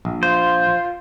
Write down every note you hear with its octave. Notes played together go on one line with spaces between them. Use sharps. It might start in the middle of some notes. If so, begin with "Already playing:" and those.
A#1
F4 C5